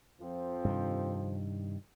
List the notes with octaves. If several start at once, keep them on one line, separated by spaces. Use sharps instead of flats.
F2 F3 C4
G2 C3 D#3